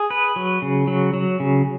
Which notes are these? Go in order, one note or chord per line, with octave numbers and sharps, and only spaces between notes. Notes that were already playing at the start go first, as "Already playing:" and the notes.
Already playing: G#4
B4
F#3
C#3
F#3
F#3
C#3